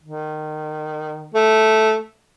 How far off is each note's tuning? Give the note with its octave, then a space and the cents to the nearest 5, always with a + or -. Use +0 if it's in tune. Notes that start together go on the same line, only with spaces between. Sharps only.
D#3 -20
A3 -5